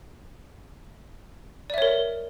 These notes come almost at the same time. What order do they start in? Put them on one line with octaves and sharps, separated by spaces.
D5 E5 C#5 A#4